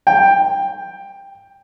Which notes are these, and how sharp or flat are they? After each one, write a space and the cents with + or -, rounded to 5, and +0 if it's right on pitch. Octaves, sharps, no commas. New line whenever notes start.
G5 +10